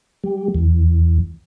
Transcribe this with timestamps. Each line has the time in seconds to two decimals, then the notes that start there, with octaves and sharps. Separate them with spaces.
0.24 G3
0.54 E2